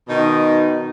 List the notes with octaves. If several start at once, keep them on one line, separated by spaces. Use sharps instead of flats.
B2 D#3 D#4